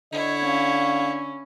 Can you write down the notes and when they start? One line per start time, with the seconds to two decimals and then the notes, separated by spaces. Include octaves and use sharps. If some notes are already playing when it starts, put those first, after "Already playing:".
0.12 D3 E4 C#5 D#5
0.44 C#4 F5